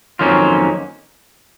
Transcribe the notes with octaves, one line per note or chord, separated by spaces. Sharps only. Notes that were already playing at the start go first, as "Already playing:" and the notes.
F2 D#3 F#3 A#3 C#4 F4